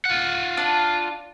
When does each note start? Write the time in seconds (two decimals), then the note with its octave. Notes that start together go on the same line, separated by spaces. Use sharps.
0.05 F4 F#5
0.57 D4